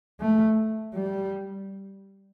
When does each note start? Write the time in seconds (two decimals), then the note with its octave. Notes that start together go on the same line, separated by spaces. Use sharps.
0.20 A3
0.94 G3